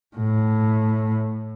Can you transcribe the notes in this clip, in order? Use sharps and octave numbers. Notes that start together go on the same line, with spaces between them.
A2